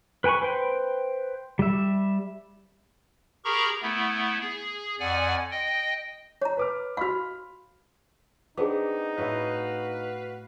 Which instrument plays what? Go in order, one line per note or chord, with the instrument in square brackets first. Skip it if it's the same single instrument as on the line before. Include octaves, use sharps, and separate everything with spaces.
[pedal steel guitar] B4 G5 G#5 B5 C#6
B4 C5 G5
G3 E5
[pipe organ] G4 G#4 A#4 A#5 B5 C#6
A3 B3 E4
G#4
F2 D5 F#5 G#5
D#5 G5
[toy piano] C#5 A#5
[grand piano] B4 D6 F6
[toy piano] F#4 F5 [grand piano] B5 C6 F6
[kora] B3 C4 D4 [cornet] D#4 [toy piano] G#4 D6
[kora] A2 E4 [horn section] F#4 B4 F5